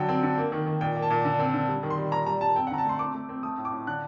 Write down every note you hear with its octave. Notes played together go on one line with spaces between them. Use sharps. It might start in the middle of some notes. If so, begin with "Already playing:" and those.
Already playing: D3 F#3 G5
C4
D3
A#3
D#3
D#3
A#2 G5
A#3
A5
A#2
D3
C4
D3
G3
D#3
C6
G3
A#2 A#5
G3 A#5
G3 A5
C4 G5
F#5
D3 A#5
A5
A3 C6
C4 D6
A3
C4
A3 D#6
A2
D6
A2
D3 F#6